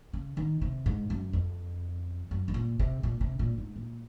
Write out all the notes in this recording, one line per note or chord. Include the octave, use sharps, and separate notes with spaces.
C#3
D#3
C3
G#2
F#2
F2
F#2
G#2
A#2
C3
A#2
C3
A#2
G#2
A#2